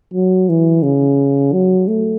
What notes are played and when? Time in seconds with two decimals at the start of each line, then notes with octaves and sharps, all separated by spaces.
0.14 F#3
0.49 E3
0.83 C#3
1.53 F#3
1.88 A3